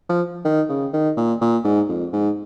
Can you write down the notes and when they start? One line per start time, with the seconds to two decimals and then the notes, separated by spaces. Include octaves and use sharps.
0.09 F3
0.45 D#3
0.69 C#3
0.93 D#3
1.17 A#2
1.41 A#2
1.64 G#2
1.89 F2
2.13 G#2